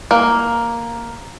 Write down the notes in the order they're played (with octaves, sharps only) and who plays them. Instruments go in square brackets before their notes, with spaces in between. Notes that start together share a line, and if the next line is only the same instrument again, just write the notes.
[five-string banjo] A#3